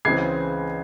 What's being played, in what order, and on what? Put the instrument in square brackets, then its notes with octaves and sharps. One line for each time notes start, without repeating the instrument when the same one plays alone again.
[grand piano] C#2 C#3 E3 G#3 C4 G#6 C7